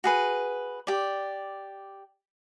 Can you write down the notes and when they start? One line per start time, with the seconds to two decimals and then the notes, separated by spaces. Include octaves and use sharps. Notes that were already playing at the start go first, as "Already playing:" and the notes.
0.04 F#4 G#4 B4
0.87 G4 D5